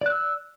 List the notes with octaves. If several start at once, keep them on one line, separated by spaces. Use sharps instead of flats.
D5 E6 F#6